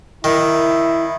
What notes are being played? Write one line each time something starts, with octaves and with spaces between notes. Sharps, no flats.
D#3 E4